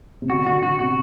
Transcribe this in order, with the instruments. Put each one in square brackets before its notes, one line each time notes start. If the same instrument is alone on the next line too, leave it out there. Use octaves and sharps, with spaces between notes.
[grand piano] C3
[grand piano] D3 [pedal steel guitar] F#4
[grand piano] D3 [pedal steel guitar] F#4
[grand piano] D3 [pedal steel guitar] F#4
[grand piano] C3 [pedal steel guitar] F#4